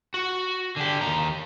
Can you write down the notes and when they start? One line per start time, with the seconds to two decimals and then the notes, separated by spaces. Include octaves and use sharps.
0.14 F#4
0.76 D3 G4
1.01 D#2 A#5